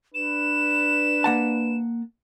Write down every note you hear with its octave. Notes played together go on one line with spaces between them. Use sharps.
D4 B4 E7
A#3 F#5 A5